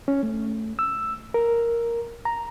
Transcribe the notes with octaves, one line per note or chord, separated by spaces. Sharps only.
C#4
A3
E6
A#4
A#5